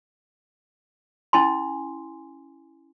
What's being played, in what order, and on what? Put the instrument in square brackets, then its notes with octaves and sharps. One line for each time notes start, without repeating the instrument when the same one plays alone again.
[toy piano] C#4 E4 G#5 C6